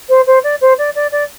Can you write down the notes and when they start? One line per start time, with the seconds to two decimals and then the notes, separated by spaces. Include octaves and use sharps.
0.09 C5
0.27 C5
0.43 D5
0.61 C5
0.78 D5
0.95 D5
1.12 D5